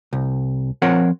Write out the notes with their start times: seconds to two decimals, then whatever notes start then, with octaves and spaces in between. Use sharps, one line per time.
0.13 C2
0.82 F3 C4 A#4 C#5 F#5